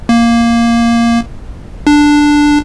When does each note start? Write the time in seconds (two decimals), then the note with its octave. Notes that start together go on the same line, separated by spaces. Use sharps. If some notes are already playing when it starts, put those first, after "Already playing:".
0.09 A#3
1.87 D4